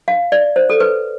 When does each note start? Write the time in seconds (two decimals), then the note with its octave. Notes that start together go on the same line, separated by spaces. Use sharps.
0.08 F5
0.32 D5
0.56 C5
0.70 A4
0.80 B4